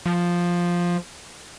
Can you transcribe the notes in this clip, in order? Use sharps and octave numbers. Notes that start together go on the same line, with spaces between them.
F3